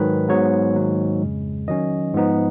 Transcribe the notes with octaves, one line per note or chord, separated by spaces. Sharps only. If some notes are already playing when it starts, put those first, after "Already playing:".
Already playing: G#2 D#3 F#3 B4
G#2 F#3 B3 C#5
G#2 D#3 F#3 A#3
F2 C#3 G#3
D#3 F#3 C#4 D#5
G#2 F3 B3 D#4